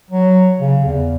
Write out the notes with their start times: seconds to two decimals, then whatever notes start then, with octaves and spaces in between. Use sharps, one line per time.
0.11 F#3
0.60 C#3
0.85 E2